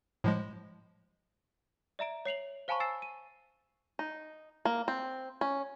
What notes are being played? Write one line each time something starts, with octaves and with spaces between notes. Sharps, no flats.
A2 F3 G#3
D5 E5 A#5 D7
C#5 C7 F7 F#7
C5 F5 G#5 A5 B5 C#6
G#5 E6 A6 C7 E7
D#7
D#4
A#3
C4
C#4